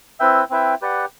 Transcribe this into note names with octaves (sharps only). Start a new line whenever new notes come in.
C4 E4 B4 E5 G5
C4 E4 B4 E5 G5
G4 B4 D5 F#5